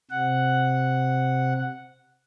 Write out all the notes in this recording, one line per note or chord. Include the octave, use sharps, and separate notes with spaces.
C3 F#5